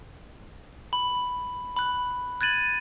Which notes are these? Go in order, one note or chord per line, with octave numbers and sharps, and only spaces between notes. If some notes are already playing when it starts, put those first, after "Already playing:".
B5
B5 F#6
F#6 G#6 A6 D#7 F#7